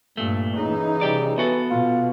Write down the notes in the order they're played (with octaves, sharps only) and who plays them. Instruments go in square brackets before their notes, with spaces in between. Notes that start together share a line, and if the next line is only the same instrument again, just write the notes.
[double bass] G2 [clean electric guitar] A#2 A3
[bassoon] C#3 [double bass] E3 D#4
[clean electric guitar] C2 G4 D5
[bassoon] E3 [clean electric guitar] B3 F#4 A4
[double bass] B2 [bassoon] F4